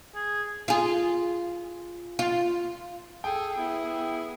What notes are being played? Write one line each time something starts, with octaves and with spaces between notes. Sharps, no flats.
G#4
F4 G#4
F4
G#4 A4 G5
B3 E4 G#4